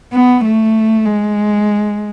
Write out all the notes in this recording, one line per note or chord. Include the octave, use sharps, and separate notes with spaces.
B3
A3
G#3